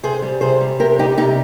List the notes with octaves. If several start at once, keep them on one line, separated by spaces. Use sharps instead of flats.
C3 G#4 C5
G3
C3 G#4 C5
G3
C3 G4 A#4
G3 D#4 G4
C3 D#4 G4